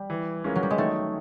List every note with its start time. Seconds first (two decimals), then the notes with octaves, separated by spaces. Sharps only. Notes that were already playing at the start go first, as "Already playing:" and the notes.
Already playing: G3
0.10 E3
0.44 G#3 C#4 F4 A#4
0.55 F#3
0.63 G3
0.70 G#3
0.78 D#3 A3